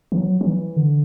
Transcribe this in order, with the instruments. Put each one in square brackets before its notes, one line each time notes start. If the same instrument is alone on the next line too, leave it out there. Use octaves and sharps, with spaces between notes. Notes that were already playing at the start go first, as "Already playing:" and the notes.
[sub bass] E3
F#3
F#3
E3
D3